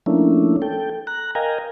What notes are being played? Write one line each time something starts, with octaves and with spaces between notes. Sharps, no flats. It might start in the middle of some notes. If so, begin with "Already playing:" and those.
F3 A3 A#3 C#4 D4 E4
A4 G5
A#5 F#6
A#4 D#5 F5 G5 G#5 A#5